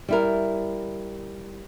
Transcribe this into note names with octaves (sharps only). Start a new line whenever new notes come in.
G3 E4 A#4